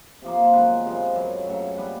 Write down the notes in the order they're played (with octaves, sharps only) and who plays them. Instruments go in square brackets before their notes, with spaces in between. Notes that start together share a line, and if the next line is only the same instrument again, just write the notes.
[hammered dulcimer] C3 F3 A#3
C5
C5
F#2 D#3 G#3 B3 B4
C3 F3 G#3
F#2 C#3 F#3
C#3 F#3 A3
A#2 G3 B3 B4